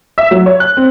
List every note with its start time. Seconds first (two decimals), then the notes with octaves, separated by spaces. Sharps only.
0.18 E5
0.31 F#3
0.46 C#5
0.60 F#6
0.77 C4